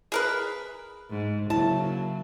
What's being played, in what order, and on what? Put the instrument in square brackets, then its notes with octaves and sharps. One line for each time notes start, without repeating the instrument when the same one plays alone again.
[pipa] G#4 A#4 B4
[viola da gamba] G#2
[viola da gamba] C#3 F#3 A#3 [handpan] E4 [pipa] A5